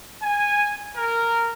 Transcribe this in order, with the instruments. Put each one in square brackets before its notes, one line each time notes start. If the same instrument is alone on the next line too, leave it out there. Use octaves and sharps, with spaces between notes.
[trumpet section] G#5
A#4